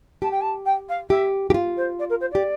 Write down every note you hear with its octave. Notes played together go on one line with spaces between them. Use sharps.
G4 A5
G5
A5
G5
F5
G4 E5
G4
F4
C5
D5
A#4
C5
G4 D5